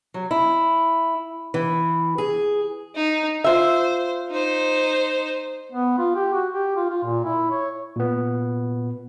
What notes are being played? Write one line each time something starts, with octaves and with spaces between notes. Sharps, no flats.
F#3
E4
E3
G#4
D#4
F4 C5 E5
D#4 C5
B3
F4
G4
F#4
G4
F4
F4
A#2
E4
C#5
A#2 B3